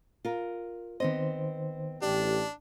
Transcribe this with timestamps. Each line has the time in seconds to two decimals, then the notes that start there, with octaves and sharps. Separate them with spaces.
0.25 F4 A#4
1.00 D#3 B3 C4 C5 D#5
2.02 A1 D4 G4